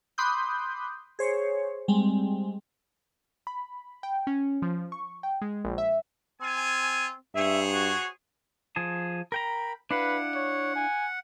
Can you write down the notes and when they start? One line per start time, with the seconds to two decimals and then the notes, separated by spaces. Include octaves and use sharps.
0.18 B5 C6 D6 D#6 F#6 G6
1.19 G#4 C5 C#5
1.88 G3 G#3 C4
3.47 B5
4.03 G5
4.27 C#4
4.62 F3
4.92 C#6
5.23 G5
5.42 G#3
5.65 A#1
5.78 E5
6.41 C4 F4 G#5
7.35 G2 G#4 C5 C#5 E5
7.73 F#4
8.76 F3 G#4 A5
9.32 A#4 G5 A#5 B5
9.91 D4 E4 B4 F5 F#5
10.35 C#5
10.75 G#5